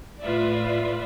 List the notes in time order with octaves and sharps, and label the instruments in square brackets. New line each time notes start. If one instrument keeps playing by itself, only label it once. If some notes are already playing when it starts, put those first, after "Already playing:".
[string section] A2 F4 B4 D5 E5